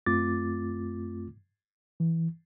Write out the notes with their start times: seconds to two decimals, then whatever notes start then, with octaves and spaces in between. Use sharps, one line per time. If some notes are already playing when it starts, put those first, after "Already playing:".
0.06 F#2 A3 C4 F4 D6 A6
2.00 E3